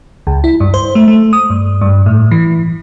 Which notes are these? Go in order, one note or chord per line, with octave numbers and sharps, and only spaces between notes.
C#2
E4
G2
C5
A3
A3
D#6
G2
G2
A2
E3